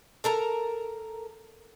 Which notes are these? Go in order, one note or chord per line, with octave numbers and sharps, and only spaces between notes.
A4 A#4 A#5